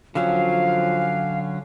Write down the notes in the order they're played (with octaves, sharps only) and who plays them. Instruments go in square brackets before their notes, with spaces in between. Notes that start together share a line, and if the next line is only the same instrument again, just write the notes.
[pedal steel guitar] D3 F#3 C#4 [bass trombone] F3 [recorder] F5